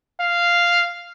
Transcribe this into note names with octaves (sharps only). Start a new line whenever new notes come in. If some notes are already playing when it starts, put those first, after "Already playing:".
F5